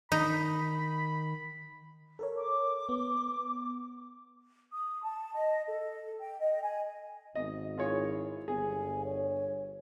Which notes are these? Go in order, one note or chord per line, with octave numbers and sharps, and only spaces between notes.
D#3 D#4 B5
A4 A#4 C#5
D6
B3
D#6
A5
D#5
A4
G5
D#5
G#5
G#1 D#5
E4 F4 G#4 C#5
G1 G#4 G#5
C#5